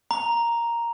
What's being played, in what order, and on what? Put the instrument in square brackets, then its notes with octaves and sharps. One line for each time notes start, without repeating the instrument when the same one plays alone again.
[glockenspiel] A#5